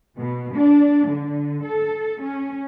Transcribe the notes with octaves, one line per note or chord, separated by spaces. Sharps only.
B2
D4
D3
A4
C#4